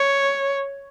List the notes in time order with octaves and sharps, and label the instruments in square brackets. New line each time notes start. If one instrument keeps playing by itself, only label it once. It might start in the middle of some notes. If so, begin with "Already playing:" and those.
Already playing: [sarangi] C#5